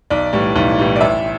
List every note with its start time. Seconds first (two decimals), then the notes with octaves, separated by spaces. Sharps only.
0.10 B1 D5
0.33 A2 E3 G3
0.56 B1
0.79 A2 E3 G3
0.96 D5
1.01 A1 E5